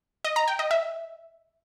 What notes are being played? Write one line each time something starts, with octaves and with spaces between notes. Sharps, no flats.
D#5
A#5
G5
D#5
E5